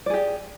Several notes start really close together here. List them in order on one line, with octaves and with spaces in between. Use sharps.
D5 G#4 G4